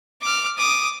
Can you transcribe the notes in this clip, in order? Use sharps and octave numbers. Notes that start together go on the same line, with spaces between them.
D6 F6
D6 D#6